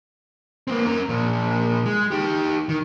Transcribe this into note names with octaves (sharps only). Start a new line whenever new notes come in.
A#3 C4
C#4 A#4
A#2 F3
G#3
D#4 G4
D#3